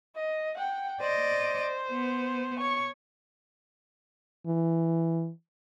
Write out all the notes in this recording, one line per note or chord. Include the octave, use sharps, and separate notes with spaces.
D#5
F#5 G5
C5 D5 D#5
B3
C#5 C#6
E3